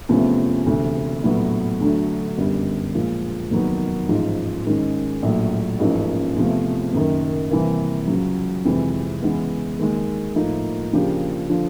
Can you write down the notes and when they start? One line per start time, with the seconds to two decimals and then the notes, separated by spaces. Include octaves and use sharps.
0.09 E2 C3 F3 A3 C#4
0.66 E1 D2 C3
1.23 A#1 A2 F#3 B3
1.80 D2 D3 F#3 A3 D4
2.38 G1 F#2 D3 G3
2.94 A#2 F3 G#3
3.51 F1 D#2 D#3 F#3 B3
4.08 A1 G#2 F3
4.65 G#2 D#3 G#3 C#4
5.22 A#1 A2 F#3
5.79 A1 G#2 F3 A#3 C#4
6.36 E2 C3 F3 A3
6.93 F#1 F#2 D#3
7.51 C3 E3 G3 A#3
8.08 C#2 C#3 F#3
8.65 F2 C3 E3 G#3
9.22 C#3 E3 G#3 B3
9.79 D#2 D#3 G#3
10.36 A2 F3 A#3 D#4
10.93 C#3 F3 A#3 D4 G4
11.50 D3 F3